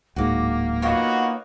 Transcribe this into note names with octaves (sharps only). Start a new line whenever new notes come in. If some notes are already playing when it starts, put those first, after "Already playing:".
D1 G#2 A#3 F#4 D6
B3 D#4 F4 F#4 A#4 C#5